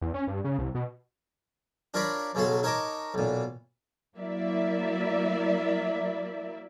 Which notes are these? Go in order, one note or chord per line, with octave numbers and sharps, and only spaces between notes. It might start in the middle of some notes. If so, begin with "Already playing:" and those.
E2
C#4
G2
C#3
C2
B2
D4 F4 A#4 C#5 D5 B5
B1 C#3 F#3 A4 C6
D#4 A#4 C#5 D#5 A5 D6
B1 A#2
F#3 A#3 E4 D5 E5